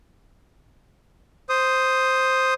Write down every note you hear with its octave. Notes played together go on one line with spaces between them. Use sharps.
C5 D#6